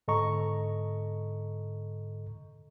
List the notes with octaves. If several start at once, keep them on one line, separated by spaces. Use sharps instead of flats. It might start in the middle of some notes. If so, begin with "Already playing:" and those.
G#2 D3 A4 D#5 A#5 C#6